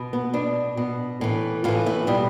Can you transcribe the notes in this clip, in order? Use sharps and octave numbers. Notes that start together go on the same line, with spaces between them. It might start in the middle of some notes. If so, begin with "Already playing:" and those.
Already playing: B2
B3
B2 D4
B2
A2 E3
A2 E3 F4
E4
B2 G3